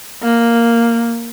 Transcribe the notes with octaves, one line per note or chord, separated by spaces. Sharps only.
A#3